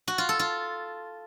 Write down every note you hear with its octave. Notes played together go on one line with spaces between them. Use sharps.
F#4
F4
A4
F4